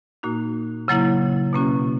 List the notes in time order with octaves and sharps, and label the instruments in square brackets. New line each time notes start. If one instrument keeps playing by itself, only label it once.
[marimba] A#2 A#3 D#4 F#4
C#3 F#3 A#3 E4
B2 A#3 C#4 F#4